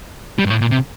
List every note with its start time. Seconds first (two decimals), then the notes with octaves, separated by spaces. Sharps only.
0.39 G3
0.44 G2
0.50 A2
0.61 A#2
0.71 C3